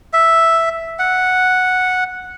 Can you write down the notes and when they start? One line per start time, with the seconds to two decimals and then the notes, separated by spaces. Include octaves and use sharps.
0.13 E5
0.99 F#5